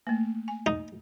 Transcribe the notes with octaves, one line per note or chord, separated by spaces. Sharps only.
A3 A#3
G#5
D#4